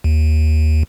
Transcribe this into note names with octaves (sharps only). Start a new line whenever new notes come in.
D#2